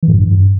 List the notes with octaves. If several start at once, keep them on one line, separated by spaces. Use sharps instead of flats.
E3
G#2
G2